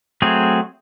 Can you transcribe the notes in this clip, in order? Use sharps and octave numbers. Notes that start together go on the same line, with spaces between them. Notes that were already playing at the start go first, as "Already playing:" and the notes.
F#3 A3 C4 G#4